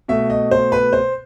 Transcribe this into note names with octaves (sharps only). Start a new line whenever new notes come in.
B2 A3 E5
D#5
C5
B4
C5